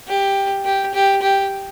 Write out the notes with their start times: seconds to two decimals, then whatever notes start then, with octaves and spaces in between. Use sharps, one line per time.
0.08 G4
0.65 G4
0.94 G4
1.22 G4